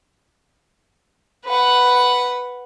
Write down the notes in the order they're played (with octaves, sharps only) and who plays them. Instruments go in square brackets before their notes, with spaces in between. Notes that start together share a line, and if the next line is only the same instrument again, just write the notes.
[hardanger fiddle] B4 F#5